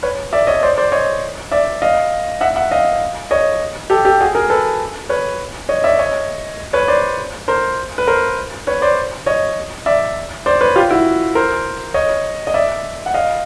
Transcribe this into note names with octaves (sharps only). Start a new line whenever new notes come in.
B4 C#5
D5 E5
C#5 D#5
C5 D5
C5 D5
C#5 D#5
D5 E5
D#5 F5
E5 F#5
E5 F#5
D#5 F5
C#5 D#5
G4 A4
G4 A4
F#4 G#4
G#4 A#4
A4 B4
B4 C#5
C#5 D#5
D5 E5
C#5 D#5
B4 C#5
C5 D5
A#4 C5
B4
A#4 C5
B4 C#5
C5 D5
C#5 D#5
D5 E5
C5 D5
B4 C#5
F4 G4
E4 F#4
A#4 C5
C#5 D#5
D#5
D5 E5
F#5
D#5 F5